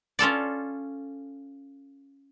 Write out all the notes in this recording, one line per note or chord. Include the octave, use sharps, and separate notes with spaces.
C#4 F4 A4 D5